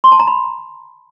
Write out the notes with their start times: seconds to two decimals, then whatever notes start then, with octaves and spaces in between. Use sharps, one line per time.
0.04 C6
0.12 A5
0.20 A#5
0.27 B5